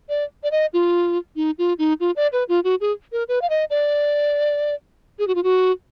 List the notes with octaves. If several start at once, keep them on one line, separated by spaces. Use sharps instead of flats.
D5
D5
D#5
F4
D#4
F4
D#4
F4
D5
B4
F4
F#4
G#4
A#4
B4
F5
D#5
D5
G#4
F#4
F4
F#4